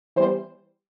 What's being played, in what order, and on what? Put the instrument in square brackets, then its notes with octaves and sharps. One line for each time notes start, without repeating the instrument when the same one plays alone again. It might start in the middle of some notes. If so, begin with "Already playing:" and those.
[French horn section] E3 G3 B3 C5